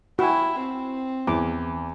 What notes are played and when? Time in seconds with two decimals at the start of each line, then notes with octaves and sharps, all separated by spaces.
0.19 E4 F#4 G5 G#5
0.58 C4
1.27 E2 D6